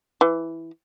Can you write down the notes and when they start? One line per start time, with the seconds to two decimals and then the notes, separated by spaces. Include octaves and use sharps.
0.21 E3